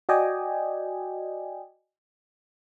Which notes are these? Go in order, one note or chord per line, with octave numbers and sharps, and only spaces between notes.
F#4 D5 D#5 G5 G#5